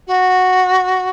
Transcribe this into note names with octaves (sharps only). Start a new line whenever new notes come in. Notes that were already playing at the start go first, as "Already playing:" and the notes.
F#4